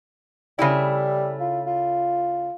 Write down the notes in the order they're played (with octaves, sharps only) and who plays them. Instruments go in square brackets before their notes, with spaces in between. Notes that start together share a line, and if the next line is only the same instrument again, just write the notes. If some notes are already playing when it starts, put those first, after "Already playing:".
[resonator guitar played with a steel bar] C#3 A3 E4 [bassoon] G3
[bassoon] F4
F4